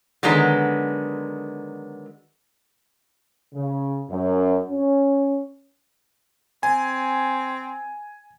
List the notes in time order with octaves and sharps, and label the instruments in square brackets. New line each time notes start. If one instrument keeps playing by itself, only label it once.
[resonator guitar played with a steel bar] D3 D#3 F#3 G#3 B3
[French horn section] C#3
F#2
C#4
[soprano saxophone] C4 [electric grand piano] G#5